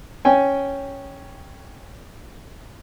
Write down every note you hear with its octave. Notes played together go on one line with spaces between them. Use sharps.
C#4 G5 G#5